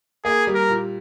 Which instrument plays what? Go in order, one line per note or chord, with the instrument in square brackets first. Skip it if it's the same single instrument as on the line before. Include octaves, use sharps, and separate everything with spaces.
[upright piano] A#3 [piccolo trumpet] G#4
[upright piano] G3
[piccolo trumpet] A#4
[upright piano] A#2